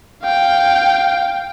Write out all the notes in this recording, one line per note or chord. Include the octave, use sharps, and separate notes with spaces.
F5 G5